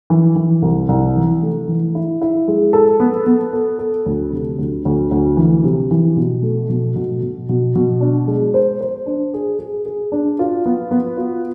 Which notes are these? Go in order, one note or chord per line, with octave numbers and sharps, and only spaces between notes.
E3
E3
C2
C2
E3
A3
E3
E4
E4
G#3
A4
B3
B3
A4
A4
D2
C3
D2
D2
D2
E3
C3
E3
B2
A3
B2
B2
B2
B2
B2
D4
G#3
C5
C5
D4
G#4
G#4
G#4
D4
F4
B3
B3
F4